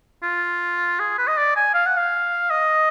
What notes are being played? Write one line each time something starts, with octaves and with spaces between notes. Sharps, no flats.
F4
G#4
B4
D#5
D5
G#5
F5
F#5
F5
D#5